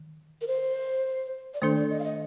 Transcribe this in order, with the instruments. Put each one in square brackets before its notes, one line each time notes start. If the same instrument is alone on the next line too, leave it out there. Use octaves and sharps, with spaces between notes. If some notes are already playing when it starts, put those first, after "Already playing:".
Already playing: [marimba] D#3
[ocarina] A#4
C5
D5
[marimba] D#3 A3 D4 A4 [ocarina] C5
[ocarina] D5
D#5
F5
D#5